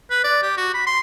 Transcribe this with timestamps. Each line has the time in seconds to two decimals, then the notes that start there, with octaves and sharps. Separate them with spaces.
0.10 B4
0.24 D5
0.43 G4
0.57 F#4
0.74 B5
0.87 C6